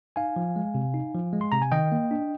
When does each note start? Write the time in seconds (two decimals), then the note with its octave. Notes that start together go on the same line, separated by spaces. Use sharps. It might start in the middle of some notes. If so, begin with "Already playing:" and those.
0.16 D#4 F5 G#5
0.36 F3
0.56 G#3
0.74 C3
0.94 D#4
1.14 F3
1.33 G#3
1.41 C6
1.52 C3 A#5
1.62 G#5
1.72 D#3 D#5 G5
1.92 A#3
2.11 D4